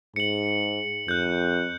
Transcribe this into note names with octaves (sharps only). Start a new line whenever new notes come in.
G#2 C#7 F#7
F2 F#6 G6